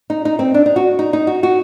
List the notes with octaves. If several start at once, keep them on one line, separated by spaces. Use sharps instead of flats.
D#4
D#4
C4
D4
D#4
F#4
D#4
D#4
F#4
F#4